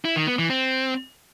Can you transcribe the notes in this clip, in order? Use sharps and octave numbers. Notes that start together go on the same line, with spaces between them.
E4
D#3
B3
E3
C4